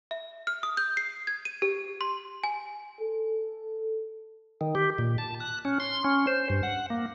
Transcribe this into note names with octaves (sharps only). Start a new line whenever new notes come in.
E5
F6
D#6
G6
C7
G#6
D#7
G4
C6
G#5
A4
D#3
G4
A#2
A5
F#6
C#4
C6
C#4
C5
G2
F#5
A#3